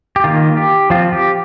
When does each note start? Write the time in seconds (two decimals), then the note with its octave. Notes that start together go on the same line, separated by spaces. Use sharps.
0.16 G4
0.24 D#3 A#3 F4
0.57 G4
0.90 F3 C4 F4
1.13 G4